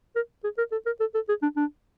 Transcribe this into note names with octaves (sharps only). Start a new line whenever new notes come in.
A#4
G#4
A#4
A4
A#4
A4
A4
G#4
D4
D4